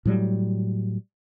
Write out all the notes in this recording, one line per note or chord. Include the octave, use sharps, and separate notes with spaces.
A2 F#3 G3